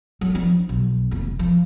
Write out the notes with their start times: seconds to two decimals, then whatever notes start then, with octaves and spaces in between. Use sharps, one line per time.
0.21 F#3
0.35 F3 D4
0.69 B1
1.11 F1 D#2
1.39 F3